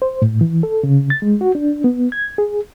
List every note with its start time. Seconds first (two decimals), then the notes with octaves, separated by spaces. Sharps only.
0.02 C5
0.22 A2
0.41 E3
0.63 A4
0.83 C#3
1.10 A6
1.22 G#3
1.41 F#4
1.55 D4
1.84 B3
2.12 G#6
2.38 G#4